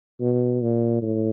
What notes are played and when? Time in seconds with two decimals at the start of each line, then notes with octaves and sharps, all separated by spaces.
0.21 B2
0.62 A#2
1.02 A2